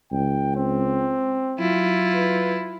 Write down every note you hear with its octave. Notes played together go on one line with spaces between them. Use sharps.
C#2 G5
C4
F#3 E4 F4
B4